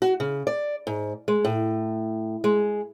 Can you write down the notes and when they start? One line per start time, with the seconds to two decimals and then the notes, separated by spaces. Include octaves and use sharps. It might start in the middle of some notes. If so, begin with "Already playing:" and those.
0.02 F#4
0.20 C#3
0.47 D5
0.87 G#2
1.28 G#3
1.45 A2
2.44 G#3